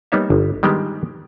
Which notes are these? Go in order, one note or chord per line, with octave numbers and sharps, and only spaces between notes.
G3 A#3 B3 D#4 C#5 E5
G1
D#3 G3 G#3 B3 G4